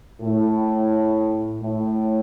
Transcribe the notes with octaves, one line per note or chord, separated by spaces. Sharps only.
A2
A2